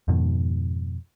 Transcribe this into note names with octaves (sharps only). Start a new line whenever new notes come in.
F2 G#2 B2 D#3